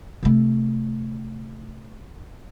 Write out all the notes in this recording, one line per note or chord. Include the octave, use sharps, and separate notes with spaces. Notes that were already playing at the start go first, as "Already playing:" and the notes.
C3 A3